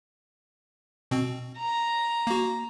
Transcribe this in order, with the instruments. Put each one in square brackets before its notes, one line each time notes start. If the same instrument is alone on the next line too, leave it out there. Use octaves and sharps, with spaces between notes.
[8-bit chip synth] B2 C4
[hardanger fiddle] A#5
[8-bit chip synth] A#3 F#4